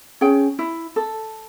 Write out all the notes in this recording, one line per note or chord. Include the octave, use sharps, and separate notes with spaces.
C#4 G#4 C#5 G5
E4
A4